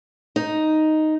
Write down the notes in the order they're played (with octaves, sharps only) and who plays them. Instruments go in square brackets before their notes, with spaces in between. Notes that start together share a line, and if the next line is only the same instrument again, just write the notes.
[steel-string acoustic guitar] D#4